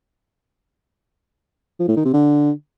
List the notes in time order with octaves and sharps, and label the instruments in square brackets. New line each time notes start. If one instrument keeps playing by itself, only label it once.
[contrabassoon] F3
A2
D#3
C3
D3